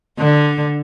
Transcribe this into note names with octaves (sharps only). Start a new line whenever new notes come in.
D3